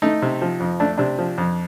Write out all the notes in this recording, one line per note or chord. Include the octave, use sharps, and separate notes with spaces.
A3 D#4
C3
F3
F2
A3 D4
C3 D4
F3
F2